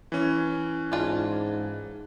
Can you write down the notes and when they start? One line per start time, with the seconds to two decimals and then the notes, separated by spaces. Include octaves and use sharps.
0.12 E3 C#4
0.92 G#2 D4 F4 D5